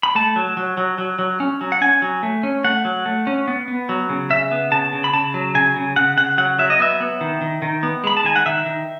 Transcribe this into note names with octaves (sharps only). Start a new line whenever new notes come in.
B5
A3 A5
F#3
F#3
F#3
F#3
F#3
C#4
F#3
F#5
C#4 G#5
F#3
A3
C#4
A3 F#5
F#3
A3
C#4
B3
B3
F#3
C#3
C#3 E5
B3
C#3 A5
C#3
B5
C#3 A5
F#3
C#3 G#5
C#3
C#3 F#5
C#3 F#5
F#3 F#5
F#3 E5
D#5
B3 E5
B3
D#3
D#3
D#3
B3
G#3 B5
A5
D#3 G#5
F#5
D#3 E5
D#3